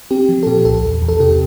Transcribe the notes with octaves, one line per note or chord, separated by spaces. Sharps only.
C4 G4
F3
A4
A#2 G4
C2 A4
E2
E2
A4
C3 G4